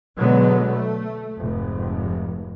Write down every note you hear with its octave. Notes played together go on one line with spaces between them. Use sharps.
B2 D3 F#3 G#3 B3
A3
F1 G#2